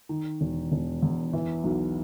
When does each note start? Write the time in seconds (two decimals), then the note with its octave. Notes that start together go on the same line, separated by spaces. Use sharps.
0.09 D#3
0.41 E1
0.72 E1
1.02 E2
1.33 E3
1.64 B1